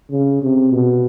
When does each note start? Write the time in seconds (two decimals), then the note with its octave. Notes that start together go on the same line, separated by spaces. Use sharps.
0.11 C#3
0.42 C3
0.72 B2